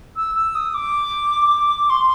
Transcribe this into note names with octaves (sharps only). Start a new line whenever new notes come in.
E6
E6
D#6
D6
C6